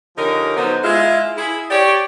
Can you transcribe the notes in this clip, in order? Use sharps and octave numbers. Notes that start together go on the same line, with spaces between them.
D3 F3 C#4 D#4 G4 A#4
D3 F#3 B3 D#4 C5
G#3 E4 F4
E4 G#4
G4 C#5 D5